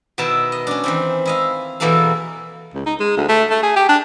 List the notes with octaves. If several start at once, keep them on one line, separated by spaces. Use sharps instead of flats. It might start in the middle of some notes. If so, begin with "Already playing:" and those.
B2 D#3 B3 E4 A5
D#5
C#4 D4
D#3 E3 C4
E4 D#5 F5
E2 B2 E3 A#3 A4 F5
C#2
D#4
G#3
D2
A3
A3
G#4
G4
D4